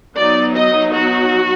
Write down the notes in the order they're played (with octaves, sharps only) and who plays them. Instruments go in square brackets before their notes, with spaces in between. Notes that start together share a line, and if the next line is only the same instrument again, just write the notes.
[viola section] F#3 B3 D#4 D5
D#5
F#4